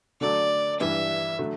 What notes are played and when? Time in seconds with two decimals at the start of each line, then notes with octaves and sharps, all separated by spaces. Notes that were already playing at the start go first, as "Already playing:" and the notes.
0.20 D3 F#3 A3 D5
0.80 G2 E3 G3 D4 G4 E5
1.39 D3 F#3 A3